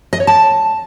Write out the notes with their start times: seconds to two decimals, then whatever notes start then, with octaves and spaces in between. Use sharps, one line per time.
0.13 D#5
0.20 C#5
0.27 A5